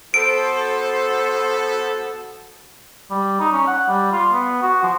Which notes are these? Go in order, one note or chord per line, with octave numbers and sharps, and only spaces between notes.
B3 F#4 A4 C5 D7
G3
D#4
C#4
F#5
G3
F4
B3
F#4
F3